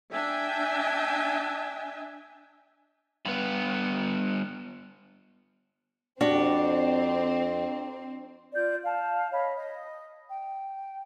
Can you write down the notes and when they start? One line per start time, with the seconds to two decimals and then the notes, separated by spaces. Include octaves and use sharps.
0.12 D4 E5 G5 G#5
3.25 G2 B3
6.21 F2 C4 D4 F#4 G4 D5
8.54 F4 D5 G6
8.83 F5 A5
9.32 C#5 D#5 F5 B5
9.55 D#5
10.30 G5